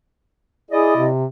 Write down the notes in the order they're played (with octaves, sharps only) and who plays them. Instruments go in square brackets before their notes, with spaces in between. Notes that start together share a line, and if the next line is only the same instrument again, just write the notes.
[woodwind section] E4 D5 D#5 [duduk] G#4
[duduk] C3